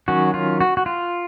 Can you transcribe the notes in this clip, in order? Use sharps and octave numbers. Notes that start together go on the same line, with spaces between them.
D#3 F#3 C#4 F#4
F4
F#4
F#4
F4